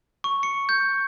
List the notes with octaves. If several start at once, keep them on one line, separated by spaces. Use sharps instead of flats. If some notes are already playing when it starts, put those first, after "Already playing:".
C#6
C#7
G6